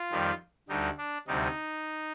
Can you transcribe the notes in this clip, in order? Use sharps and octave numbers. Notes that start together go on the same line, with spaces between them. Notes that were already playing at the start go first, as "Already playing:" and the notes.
Already playing: F4
F2 D#3 G3
D2 D3 G3 D#4
D4
D2 C3 G3 D#4